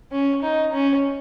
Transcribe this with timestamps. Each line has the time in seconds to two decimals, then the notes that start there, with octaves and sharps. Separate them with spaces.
0.12 C#4
0.42 D#4
0.73 C#4